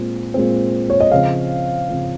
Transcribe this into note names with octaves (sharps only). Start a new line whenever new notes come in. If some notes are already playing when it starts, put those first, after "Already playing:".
Already playing: A#2 G#3 C4
A#2 G#3 C4
C#5
D#5
C#3 F3 C4 F5
C#3 F3 C4